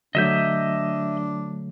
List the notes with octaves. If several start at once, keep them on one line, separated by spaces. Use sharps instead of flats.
D3 F#3 A3 D4 D#5 E5 G6